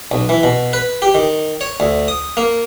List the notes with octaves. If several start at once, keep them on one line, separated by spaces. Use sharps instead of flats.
B1
E3
B2
B4
G4
D#3
C#5
D2
D#6
A#3